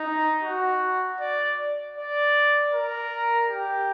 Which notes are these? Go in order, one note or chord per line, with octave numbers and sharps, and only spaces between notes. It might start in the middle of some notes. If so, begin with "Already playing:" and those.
Already playing: D#4
F#4
D5
D5
A#4
G4